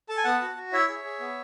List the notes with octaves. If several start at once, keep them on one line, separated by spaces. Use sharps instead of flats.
A4 A5
G#5
B3 F#5 A5
F#4
F#4
E4 C#5 E5
G#4
G#4
B3